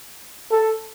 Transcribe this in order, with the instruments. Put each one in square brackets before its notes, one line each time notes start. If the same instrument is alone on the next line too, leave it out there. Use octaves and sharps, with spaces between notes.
[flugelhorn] A4